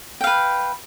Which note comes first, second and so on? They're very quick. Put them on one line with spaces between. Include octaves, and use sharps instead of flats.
G5 F5 B4